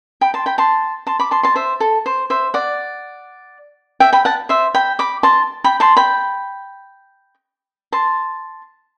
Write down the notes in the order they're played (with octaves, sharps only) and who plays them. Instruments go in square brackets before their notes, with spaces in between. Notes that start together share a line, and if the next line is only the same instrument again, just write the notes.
[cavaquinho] G5 B5
A5 C6
G5 B5
A5 C6
A5 C6
B5 D6
A5 C6
A5 C6
C5 E5
A4
C5
C5 E5
D5 F#5
E5 G5
G5 B5
F#5 A5
C5 E5
G5 B5
B5 D6
A5 C6
G5 B5
A5 C6
G5 B5
A5 C6